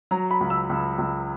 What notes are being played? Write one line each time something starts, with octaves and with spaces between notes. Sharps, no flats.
F#3 A#5
B5
C#2
E6
C#2
C#2